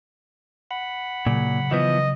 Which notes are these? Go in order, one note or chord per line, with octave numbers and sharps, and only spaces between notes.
F#5 B5
A#2 C#3 F#3
E3 F3 B3 D#5